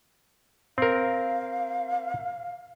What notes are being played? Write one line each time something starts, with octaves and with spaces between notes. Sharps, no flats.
C4 A#4 F5